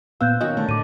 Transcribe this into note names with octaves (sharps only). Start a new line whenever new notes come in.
A#2 B3 C5 F5 E6 F#6 G6
D#3 F#3 C#4 D#5
D3 A3
A2 D6 D#7